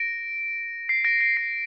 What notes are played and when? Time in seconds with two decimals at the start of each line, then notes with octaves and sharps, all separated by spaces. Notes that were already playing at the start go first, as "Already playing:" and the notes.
Already playing: A#6 D7
0.89 C7
1.04 A#6 D7
1.21 A#6 D7
1.37 C7